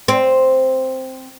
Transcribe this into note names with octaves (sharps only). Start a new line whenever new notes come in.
C4